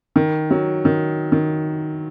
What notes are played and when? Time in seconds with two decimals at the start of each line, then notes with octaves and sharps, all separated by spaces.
0.16 D#3
0.51 F#3
0.85 D#3
1.32 D#3